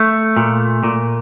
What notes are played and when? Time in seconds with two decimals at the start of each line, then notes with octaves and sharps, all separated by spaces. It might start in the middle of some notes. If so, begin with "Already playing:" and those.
Already playing: A3
0.37 A#2
0.83 A#2